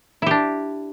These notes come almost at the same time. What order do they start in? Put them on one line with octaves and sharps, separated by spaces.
E4 G4 D4